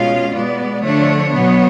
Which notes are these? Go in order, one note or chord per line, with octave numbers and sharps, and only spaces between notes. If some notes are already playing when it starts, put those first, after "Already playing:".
Already playing: B2 G#3 C#4 F4 F5
B2 G#3 B3 D5
D3 F3 A3 D4 C#5
B2 F#3 B3